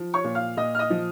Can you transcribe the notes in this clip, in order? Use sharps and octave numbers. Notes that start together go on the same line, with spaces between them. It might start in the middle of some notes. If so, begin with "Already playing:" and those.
Already playing: F3
C#5 C#6
A#2
F5 F6
A#2 D#5 D#6
F6
D#5 D#6
F3